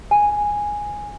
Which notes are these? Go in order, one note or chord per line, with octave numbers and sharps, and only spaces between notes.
G#5